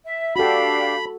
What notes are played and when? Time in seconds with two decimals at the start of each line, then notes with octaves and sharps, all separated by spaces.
0.04 E5
0.36 D4 F#4 G4 A4 F5 B5